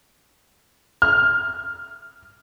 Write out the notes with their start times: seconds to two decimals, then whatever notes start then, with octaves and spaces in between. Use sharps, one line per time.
1.02 F6